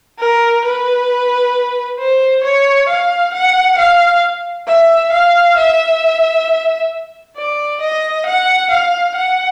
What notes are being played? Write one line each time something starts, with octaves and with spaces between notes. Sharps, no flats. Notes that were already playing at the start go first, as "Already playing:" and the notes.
A#4
B4
C5
C#5
F5
F#5
F5
E5
F5
E5
D5
D#5
F#5
F5
F#5